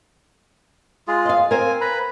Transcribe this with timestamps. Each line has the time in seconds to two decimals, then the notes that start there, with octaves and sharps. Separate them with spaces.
1.08 G#3 F4 G#4
1.25 D#5 F5
1.51 C4 A#4 C5 G#5
1.81 B4 A#5 B5